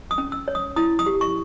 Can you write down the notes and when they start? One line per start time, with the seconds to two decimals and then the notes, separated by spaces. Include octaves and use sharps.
0.11 D#6
0.18 C#4
0.32 E6
0.48 C#5
0.55 D#6
0.76 E4 D#6
0.99 D#6
1.06 G4
1.21 C#6